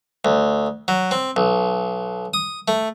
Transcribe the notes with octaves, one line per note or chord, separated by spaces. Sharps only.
D2
F#3
C4
B1
D#6
A3